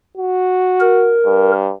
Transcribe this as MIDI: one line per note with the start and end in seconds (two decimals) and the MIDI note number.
0.17 1.16 66
0.80 1.51 70
1.26 1.71 43